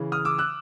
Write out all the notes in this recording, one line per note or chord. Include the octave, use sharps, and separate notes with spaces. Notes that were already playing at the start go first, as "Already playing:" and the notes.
Already playing: C#3 E3
D#6 F6
D6 E6
E6 F#6